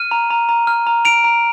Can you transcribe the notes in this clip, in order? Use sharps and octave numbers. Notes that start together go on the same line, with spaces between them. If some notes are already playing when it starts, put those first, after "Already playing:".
Already playing: F6 D#7
A#5
A#5
A#5
F6
A#5
A#5 D7 F7
A#5